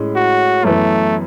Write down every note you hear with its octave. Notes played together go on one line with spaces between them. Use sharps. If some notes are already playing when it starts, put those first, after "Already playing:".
Already playing: A2 G#3 C#4
F#4
F#2 E3 A3 B3